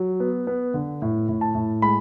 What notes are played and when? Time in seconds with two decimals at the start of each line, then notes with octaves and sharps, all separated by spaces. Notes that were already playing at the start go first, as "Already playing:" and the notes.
Already playing: F#3
0.20 B3
0.47 B3
0.74 D3
1.02 A2
1.29 A2
1.41 A5
1.55 A2
1.82 G#3 B5